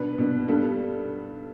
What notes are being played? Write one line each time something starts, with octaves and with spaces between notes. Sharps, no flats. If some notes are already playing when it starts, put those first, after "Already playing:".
Already playing: B2 B3 D4 B4
B2 B3 D4
G2 G3 B3 D4 A4